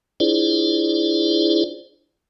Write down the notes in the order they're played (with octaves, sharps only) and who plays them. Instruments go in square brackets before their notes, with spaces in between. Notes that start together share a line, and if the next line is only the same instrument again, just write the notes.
[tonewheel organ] D4 E4 F4 G#4 C5 D5